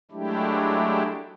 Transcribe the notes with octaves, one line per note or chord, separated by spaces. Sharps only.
F#3 G#3 A3 D4 E4 G4